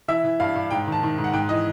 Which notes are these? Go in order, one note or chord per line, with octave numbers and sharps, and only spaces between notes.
E3 E5
E3
G2 F5
G2
G#2 G5
D#3
A5
D#3
G#2
F#5
G#2 G5
E3 D#5